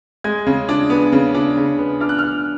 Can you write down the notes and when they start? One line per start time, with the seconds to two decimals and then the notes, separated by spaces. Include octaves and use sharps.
0.24 G#3 G#6
0.46 C#3
0.69 D4
0.90 B3
1.12 C#3
1.35 D4
1.57 C#3
1.79 B3
2.00 D4 F6
2.09 F#6
2.19 D4 F6